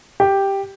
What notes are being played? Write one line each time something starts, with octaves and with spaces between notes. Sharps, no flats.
G4